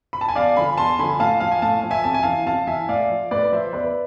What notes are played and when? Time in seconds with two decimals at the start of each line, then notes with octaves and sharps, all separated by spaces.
0.13 B5
0.21 A5
0.28 G#5
0.35 E2 D5 F5
0.56 D3 F3 G#5 B5
0.77 E2 A5 C6
0.99 D3 F3 G#5 B5
1.20 A2 F5 A5
1.40 F3 F5
1.51 G#5
1.62 A2 F5 A5
1.83 F3
1.91 E5 G#5
2.04 F2 A5
2.14 G#5
2.23 E3 F5 A5
2.46 F2 F5 A5
2.67 E3 E5 G#5
2.89 A2 D5 F5
3.10 F3
3.31 A2 B4 D5
3.52 F3 C5 E5
3.73 E2 B4 D5